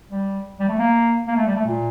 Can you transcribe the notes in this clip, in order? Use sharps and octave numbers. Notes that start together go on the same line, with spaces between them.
G3
G3
A3
A#3
A#3
A3
G3
A3
A#2